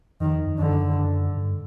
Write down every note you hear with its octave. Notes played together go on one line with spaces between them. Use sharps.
F2 D#3
E2
F2
F#2 D3
G2